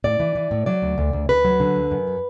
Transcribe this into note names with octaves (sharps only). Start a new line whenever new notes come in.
A2 D5
E3
E3
A2
F#3 D5
D2
D2
D2
D2 B4
F#3
D3
D2
F#2
F#3